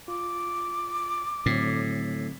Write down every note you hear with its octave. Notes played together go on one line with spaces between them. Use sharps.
F4 D6
A2 D3 F#3 C4